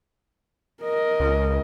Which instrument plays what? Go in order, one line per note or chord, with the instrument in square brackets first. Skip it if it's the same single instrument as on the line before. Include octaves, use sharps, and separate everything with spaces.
[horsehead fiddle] A#4 D#5
[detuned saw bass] C#2